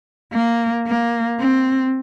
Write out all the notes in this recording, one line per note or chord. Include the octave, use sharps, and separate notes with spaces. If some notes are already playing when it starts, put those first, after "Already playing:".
A#3
A#3
C4